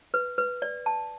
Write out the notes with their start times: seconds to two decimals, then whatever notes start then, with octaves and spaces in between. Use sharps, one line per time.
0.14 B4
0.38 B4
0.62 D5
0.86 A5